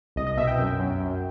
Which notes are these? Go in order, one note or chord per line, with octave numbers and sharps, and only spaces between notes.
C2 D#5
D#5
B2 E5
G5
F#2
F#2
F#2